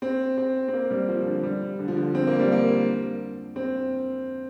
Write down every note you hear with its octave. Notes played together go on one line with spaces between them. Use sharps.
C4
C4
C4
A#3
G3
F3
D3
G3
D3
F3
D3
C4
A#3
G3
A#3
C4